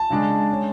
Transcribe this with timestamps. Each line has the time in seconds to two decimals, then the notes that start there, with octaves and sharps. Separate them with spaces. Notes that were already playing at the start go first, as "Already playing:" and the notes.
Already playing: A5
0.10 C#3 G#3 D4
0.51 G#3 C#4